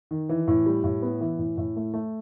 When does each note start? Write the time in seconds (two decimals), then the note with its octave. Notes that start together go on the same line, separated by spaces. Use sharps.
0.11 D#3
0.29 E3
0.48 A2
0.66 G3
0.84 A2
1.02 B3
1.21 E3
1.39 A2
1.57 A2
1.76 A3
1.94 A3